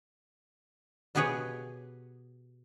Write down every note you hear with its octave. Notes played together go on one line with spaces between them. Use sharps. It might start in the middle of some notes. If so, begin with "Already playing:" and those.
B2 B3 G4 G#4 B4 C#5